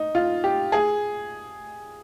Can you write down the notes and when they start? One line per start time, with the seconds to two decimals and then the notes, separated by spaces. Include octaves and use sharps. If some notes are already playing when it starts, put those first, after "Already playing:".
Already playing: D#4
0.15 F4
0.44 G4
0.72 G#4